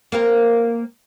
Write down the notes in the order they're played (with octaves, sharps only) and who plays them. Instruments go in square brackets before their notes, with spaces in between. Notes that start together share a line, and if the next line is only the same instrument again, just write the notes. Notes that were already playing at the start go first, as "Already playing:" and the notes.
[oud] A#3 C4 A#4